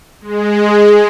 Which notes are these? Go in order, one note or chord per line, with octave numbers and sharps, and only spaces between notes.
G#3